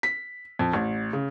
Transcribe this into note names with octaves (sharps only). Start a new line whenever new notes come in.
B6
F2
A1
C#3